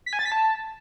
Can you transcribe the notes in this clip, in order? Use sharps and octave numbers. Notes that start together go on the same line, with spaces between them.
B6
G#5
A6
B6
A5